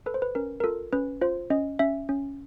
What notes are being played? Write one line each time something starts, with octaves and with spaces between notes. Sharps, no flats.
A4 B4
C5
B4
C#4 A#4
A#4
F4 A4
C#4 B4
F4 C5
C#4 D#5
C#4 E5
C#4